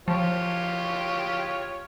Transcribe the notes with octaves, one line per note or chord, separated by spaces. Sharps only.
F3 F4 G4 C#5